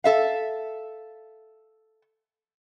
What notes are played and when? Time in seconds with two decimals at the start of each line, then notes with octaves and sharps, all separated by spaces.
0.04 A4 E5 F5